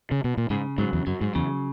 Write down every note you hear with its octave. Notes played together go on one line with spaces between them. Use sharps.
C#3
B2
A#2
G#2 C#3
G#2 F#3
E2
F#2 F#3
G#2
E2 C#3